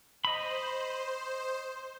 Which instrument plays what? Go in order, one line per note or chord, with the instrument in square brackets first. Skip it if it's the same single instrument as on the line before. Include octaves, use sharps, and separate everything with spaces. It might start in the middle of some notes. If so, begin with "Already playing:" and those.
[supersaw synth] C5 [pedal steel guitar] D#5 B5